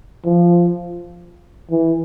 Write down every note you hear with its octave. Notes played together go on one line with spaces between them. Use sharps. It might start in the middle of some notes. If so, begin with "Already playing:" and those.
F3
E3